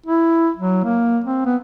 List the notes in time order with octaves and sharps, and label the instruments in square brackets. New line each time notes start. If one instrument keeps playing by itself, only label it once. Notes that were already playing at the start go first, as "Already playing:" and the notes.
[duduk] E4
F#3
A#3
C4
B3